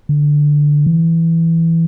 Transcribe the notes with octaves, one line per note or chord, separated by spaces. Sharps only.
D3
E3